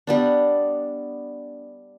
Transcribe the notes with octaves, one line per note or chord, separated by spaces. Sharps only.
G3 B3 D4